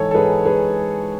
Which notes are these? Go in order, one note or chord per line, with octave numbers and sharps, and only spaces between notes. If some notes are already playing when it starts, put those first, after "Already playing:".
Already playing: G#2 E3 A4 C#5
A4
G#2 G#4 B4
G#2 G#4 B4